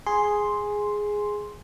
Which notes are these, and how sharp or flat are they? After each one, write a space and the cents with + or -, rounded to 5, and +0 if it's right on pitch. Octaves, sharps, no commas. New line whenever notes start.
G#4 +0 C6 +0